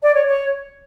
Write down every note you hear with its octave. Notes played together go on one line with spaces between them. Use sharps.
D5
C#5
C#5